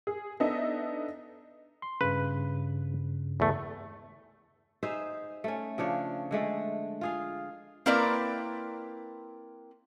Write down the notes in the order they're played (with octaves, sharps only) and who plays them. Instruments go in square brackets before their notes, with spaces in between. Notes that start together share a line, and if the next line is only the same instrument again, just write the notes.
[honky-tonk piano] G#4
B3 D4 D#4 A4 D#5 E5
[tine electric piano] C6
[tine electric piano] G2 C#3 [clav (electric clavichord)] B4
[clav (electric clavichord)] E2 A3
[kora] D#4 G#4 C5 E5
A3 C#4
C#3 F3 D4 C#5
D3 G#3 A3
F4 G#4 F5
[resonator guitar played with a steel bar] A#3 C4 E4 A#4 B4 D5